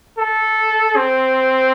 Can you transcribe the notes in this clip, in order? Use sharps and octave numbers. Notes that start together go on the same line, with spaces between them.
A4
C4